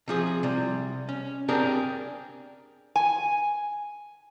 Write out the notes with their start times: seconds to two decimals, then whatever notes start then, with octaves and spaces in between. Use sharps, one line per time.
0.08 C3 F3 G#4
0.43 C3 G3
1.09 C#4
1.48 C4 D4 G4 G#4 A#4
2.96 G#5